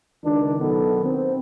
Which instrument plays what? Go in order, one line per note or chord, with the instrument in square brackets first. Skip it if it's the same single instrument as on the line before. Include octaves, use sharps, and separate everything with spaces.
[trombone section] C#2 D#3 D4
B1 D#3 B3 A4
C4